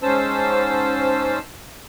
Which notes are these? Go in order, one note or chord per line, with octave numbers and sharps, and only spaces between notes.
G#2 C#4 C5 A5 E6